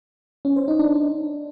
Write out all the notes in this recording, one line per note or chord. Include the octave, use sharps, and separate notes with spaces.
C#4
C5
D#4
D4